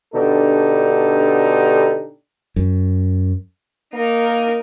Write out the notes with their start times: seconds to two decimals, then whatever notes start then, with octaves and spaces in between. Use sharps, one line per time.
0.14 B2 D3 D4 D#4 G4 A4
2.56 F#2
3.94 A#3 D#4 A#4